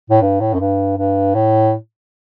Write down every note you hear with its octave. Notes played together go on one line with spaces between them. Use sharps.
A2
G2
A2
F#2
G2
G2
A2